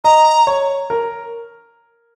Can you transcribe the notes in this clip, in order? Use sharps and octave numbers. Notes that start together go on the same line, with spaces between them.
D#5 A#5
C#5
A#4